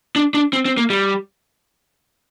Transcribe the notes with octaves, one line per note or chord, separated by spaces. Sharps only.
D4
D4
C4
C4
A#3
G3